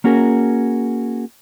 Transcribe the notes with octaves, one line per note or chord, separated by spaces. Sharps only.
A#3 C#4 F#4 G#4 A#4